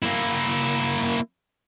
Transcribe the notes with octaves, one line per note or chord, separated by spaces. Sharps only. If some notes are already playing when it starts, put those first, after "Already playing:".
A#3 E4